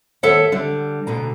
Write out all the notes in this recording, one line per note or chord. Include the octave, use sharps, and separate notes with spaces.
D#2 A4 C#5 E5 F#5
D3 G3
D2 B2 D3 A#5